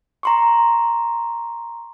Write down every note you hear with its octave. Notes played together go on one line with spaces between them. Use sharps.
A#5 C6 C#6